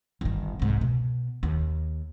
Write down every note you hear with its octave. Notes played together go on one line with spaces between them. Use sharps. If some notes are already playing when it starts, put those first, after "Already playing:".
G1 D#3
C2 G#2
B2
D#2